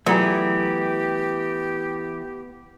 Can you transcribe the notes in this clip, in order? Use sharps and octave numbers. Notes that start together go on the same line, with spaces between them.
E3 F#3 A3 B3 F4 G4 G#4 A#5